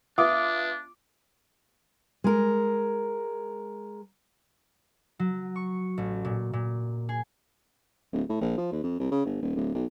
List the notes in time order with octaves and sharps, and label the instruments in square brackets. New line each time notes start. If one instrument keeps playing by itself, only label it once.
[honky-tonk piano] B3 F4 [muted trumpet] D4 [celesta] E5 D#6 [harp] D6
[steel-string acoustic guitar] G#3 A#4
[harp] F#3
C#6
A1
A#2
A#2
G#4
[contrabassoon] D1
A2
A#1
F3
D#2
F2
C2
C#3
G1
D#1
D1
B1